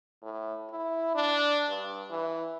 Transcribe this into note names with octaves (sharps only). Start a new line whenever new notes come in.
A2
E4
D4
G2
E3